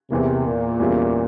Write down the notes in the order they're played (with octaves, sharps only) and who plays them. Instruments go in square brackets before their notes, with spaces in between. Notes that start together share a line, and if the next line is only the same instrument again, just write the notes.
[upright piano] E2 E3 A#3 [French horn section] C3
[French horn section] A#2
[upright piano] E2 E3 G3 C#4 F4